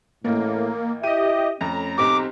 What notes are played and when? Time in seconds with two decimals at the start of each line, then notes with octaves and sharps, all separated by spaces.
0.24 A1 A2 A#3 A#4
1.03 E4 G4 D#5 E5 D#7
1.61 F2 A3 C#4 A#5
1.98 B1 C4 G4 D6